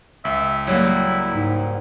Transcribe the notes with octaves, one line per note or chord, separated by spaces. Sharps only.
C#2 E5
F#3 G3 A#3 E4
G#2